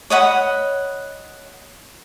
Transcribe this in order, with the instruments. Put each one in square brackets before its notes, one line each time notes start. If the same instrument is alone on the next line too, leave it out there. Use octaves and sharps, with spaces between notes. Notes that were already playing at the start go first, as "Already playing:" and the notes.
[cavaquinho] C#5 D#5 F#5 B5